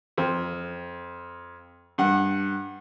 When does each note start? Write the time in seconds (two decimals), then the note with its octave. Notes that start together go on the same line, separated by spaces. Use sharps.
0.18 F2
1.98 G2 F#5